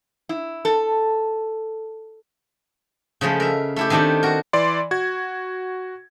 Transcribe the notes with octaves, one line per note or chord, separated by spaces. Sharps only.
E4
A4
C#3 F3 G#3 A3
A#4 E5
A3 E4 G4
D#3 A3 C4 D4 G4
F#4 A#4
E3 D5 C6
F#4 G#6